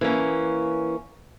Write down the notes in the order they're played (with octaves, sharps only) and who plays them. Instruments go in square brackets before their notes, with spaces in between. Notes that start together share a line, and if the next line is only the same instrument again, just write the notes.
[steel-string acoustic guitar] E3 A#3 C#4